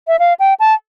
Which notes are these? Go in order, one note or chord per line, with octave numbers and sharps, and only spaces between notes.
E5
F5
G5
A5